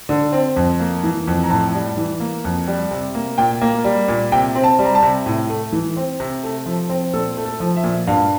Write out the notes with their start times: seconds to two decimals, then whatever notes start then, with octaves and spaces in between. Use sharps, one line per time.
0.09 D3
0.32 C4
0.56 F2
0.80 A#3
1.03 E3
1.27 F2
1.43 A#5
1.50 A2 A5
1.74 G3
1.97 E3
2.20 A#3
2.44 F2
2.67 G3
2.91 C3
3.15 A#3
3.38 A#2 G5
3.62 A#3
3.84 G3
4.08 A#2
4.32 C3 G5
4.55 C4
4.64 A5
4.79 G3
4.85 A#5
4.95 A5
5.03 C3
5.26 A2
5.50 A3
5.73 E3
5.97 C4
6.20 C3
6.44 A3
6.66 F3
6.89 C4
7.13 A#2 A4
7.37 A3
7.45 A4
7.60 F3
7.76 E5
7.84 A#2
8.07 G2 F5